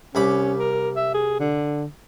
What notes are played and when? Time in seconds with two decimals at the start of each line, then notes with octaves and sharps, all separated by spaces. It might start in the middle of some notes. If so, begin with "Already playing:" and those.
0.15 C2 C#4 B5 D6
0.59 A#4
0.96 E5
1.14 G#4
1.40 D3